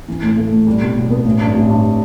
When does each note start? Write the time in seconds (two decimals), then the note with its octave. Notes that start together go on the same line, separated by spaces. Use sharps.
0.08 E3
0.23 A2
0.37 A3
0.52 A2
0.67 G3
0.81 B2
0.96 B1
1.11 B3
1.25 A1
1.40 G2
1.55 A1
1.69 G2